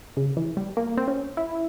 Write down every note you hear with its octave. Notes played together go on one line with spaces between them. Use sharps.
C#3
E3
G3
A#3
C4
C#4
E4